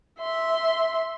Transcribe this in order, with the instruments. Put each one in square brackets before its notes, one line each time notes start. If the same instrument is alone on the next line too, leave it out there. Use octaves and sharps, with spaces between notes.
[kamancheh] E5 C6